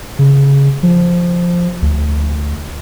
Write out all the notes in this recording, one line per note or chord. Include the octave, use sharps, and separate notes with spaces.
C#3
F3
D2